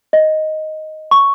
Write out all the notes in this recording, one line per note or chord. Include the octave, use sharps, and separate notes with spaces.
D#5
C#6